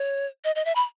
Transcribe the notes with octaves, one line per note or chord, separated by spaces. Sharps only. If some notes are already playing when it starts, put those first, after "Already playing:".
Already playing: C#5
D#5
D#5
E5
B5